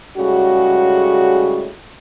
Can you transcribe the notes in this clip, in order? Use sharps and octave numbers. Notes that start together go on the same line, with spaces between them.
A2 C#3 G3 G#3 F#4